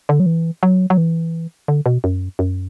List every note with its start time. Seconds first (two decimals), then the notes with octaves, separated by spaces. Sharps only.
0.09 D3
0.20 F#3
0.26 E3
0.63 F#3
0.90 F#3
0.97 E3
1.68 D3
1.86 B2
2.04 F#2
2.39 F#2